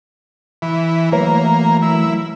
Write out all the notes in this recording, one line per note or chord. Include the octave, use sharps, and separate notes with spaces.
E3
E3 F#3 A3 A#3
E4